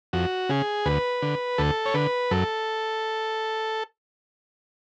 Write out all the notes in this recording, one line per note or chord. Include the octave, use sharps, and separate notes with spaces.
F2 F#4
C#3 G#4
D2 B4
D3
D2 A4
C#5
D3 B4
F#2 A4